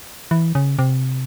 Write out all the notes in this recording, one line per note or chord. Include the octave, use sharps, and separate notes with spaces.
E3
C#3
C3